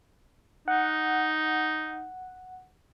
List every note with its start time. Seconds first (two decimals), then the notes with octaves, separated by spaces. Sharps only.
0.68 D#4 F#5